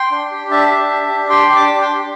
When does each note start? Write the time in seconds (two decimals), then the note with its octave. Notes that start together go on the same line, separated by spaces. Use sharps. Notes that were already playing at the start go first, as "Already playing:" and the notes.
Already playing: G5 C6
0.11 D4
0.31 G4
0.51 D4 E5 A5
0.71 G4
0.90 G4
1.10 D4
1.29 G4 G5 C6
1.49 G4
1.55 A5 D6
1.68 D4
1.82 G5 C6
1.89 G4